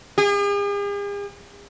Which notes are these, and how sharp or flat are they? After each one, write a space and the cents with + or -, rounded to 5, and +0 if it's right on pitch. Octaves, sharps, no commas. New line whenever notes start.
G#4 -45